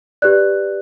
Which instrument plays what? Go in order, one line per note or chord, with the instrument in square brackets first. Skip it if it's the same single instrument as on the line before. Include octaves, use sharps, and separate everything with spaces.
[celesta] G4 B4 D5 F#6